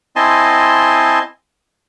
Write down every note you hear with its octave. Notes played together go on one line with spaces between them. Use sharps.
C4 E4 D#5 G#5 A5 C6